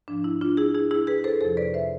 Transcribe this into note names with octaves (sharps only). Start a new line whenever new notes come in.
G#2 F3 D4
E4
D4 F4
E4 G#4
E4 G#4
E4 G#4
G#4 B4
A4 C5
F2 C3 F3 A4 C5
B4 D5
C5 E5